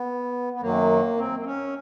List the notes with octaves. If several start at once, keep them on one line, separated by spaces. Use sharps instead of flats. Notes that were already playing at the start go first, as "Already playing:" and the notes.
Already playing: B3
B3
F#2 D#3 F#3 A#3
C4
C4
C#4